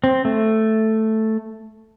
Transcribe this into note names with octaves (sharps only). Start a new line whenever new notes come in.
C4
A3